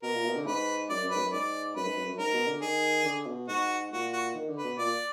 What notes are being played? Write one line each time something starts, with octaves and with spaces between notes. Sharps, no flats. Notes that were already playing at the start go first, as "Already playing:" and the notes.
B2 A#4
A#2
B2
D3
G#2 B4
F#2 D5
F#2
G#2 B4
F#2
G#2 D5
F#2 B4
G#2
F#2
F#2
G#2 A#4
B2
D3
D#3 G#4
D3
B2
G#2 F#4
A#2 F#4
F#4
D#3
D3
B4
B2
A#2 D5